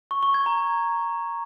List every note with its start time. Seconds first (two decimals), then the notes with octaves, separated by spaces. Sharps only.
0.11 C#6
0.23 C#6
0.34 G#6
0.46 A#5